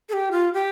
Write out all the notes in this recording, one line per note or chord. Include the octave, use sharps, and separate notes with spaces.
A4
G4
F4
G4